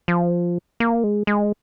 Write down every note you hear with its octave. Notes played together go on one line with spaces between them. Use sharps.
F3
A#3
G#3
G#3